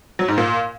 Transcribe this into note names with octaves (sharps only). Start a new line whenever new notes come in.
F#3
G#2
A#2